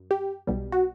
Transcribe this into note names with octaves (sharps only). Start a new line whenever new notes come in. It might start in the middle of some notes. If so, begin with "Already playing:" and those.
Already playing: F#2
G4
B1 B2 G3
F#4